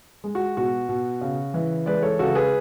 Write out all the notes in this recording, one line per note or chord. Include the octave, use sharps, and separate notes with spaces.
G#3
F#4
B2 F#4
B2
C#3
E3
G#3 B4 D5
A4 C#5
C#3 F#4 A4
A4
G#4 B4